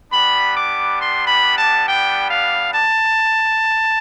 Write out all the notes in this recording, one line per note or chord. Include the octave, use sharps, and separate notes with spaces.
G3 B3 D4 B5
D6
C6
B5
A5
G5
F5
A5